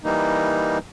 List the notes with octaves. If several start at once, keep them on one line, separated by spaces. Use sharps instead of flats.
E3 G3 A#3 D#4